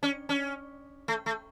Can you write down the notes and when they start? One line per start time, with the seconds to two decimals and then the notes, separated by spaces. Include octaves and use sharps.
0.03 C#4
0.29 C#4
1.08 A3
1.26 A3